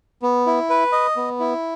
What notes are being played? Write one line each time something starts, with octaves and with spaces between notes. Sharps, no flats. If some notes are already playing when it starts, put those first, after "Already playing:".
B3
E4
B4
D#5
B3
E4